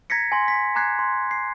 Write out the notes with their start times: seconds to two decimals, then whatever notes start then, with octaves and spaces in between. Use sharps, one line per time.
0.10 A#5 G#6 A#6 B6 C#7
0.32 G#5 C6 A#6
0.48 B6
0.75 G#5 A#5 D6 F#6 G#6 C7
0.99 C6
1.31 C7